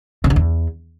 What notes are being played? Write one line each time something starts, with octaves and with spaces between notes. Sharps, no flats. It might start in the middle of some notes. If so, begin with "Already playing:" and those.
C#3
D3
E2